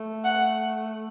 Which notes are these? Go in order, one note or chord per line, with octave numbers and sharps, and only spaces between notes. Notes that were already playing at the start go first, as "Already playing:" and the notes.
Already playing: A3
F#5